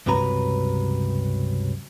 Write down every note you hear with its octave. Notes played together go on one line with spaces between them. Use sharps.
C#2 G2 C3 F#3 B4 A#5